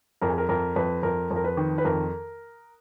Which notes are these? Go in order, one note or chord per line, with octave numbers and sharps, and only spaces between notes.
F2 A#4
G#4
A#4
F2 A#4
F2 B4
F2 A#4
F2
A#4
B4
D#3
B4
F2 A#4